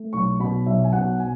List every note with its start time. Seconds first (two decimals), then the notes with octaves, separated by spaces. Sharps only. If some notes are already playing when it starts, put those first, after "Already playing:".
Already playing: A3
0.13 B1 C#6
0.40 B2 B5
0.66 B1 E5
0.84 G#5
0.93 B2 F#5
1.20 G#5